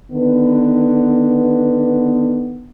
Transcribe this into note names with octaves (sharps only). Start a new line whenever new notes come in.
D3 D#3 B3